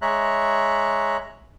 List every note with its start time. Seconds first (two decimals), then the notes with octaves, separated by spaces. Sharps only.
0.02 G#3 C#5 E5 A#5 F#6